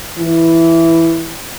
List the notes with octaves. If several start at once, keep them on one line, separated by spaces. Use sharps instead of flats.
E3